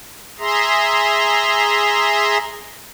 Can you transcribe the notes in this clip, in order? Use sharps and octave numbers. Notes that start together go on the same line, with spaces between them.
G#4 E5 A#5 C6